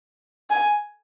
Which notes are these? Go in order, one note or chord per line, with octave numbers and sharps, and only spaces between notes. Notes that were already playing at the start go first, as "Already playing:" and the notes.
G#5